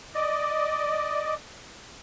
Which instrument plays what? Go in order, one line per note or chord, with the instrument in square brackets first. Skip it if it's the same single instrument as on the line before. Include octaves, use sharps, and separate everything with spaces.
[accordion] D5 D#5